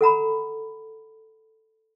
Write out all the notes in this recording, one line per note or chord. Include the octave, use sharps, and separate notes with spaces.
A4 F#5 A#5 B5